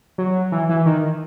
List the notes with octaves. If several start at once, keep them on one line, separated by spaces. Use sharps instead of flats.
F#3
E3
E3
D#3